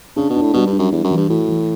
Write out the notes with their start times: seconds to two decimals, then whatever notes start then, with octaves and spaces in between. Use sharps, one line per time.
0.16 C#3 D4
0.30 B2
0.36 D4
0.41 A2
0.54 B2 G3
0.67 G2
0.73 D4
0.79 F#2
0.92 E2 G3
1.04 F#2
1.11 E3
1.17 G2
1.28 A2 F#4
1.48 E3